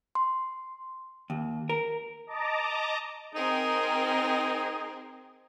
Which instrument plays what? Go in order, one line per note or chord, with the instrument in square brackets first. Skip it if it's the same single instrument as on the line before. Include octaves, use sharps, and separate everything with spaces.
[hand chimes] C6
[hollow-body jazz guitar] D#2
A#4
[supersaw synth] D#5 A5 A#5 D6
[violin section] C4 A#4 [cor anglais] D#4 [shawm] G#4